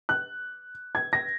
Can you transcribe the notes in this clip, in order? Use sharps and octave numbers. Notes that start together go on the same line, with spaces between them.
F#6
G#6
A#6